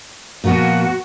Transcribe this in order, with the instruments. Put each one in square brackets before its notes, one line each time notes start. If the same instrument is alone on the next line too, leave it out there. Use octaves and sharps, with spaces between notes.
[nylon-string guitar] A#2 F3 B3 [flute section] F#4